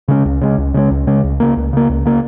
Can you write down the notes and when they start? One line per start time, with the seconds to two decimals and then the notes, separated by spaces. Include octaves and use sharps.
0.08 C#3 G#3 C#4
0.25 C#2
0.41 C#3 G#3 C#4
0.58 C#2
0.74 C#3 G#3 C#4
0.91 C#2
1.07 C#3 G#3 C#4
1.24 C#2
1.40 C#3 A#3
1.56 C#2
1.73 C#3 A#3
1.89 C#2
2.05 C#3 A#3